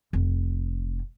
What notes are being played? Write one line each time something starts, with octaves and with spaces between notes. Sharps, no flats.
F1